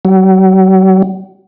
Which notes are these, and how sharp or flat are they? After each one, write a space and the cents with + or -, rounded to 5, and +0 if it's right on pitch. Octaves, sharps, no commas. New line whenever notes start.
F#3 +40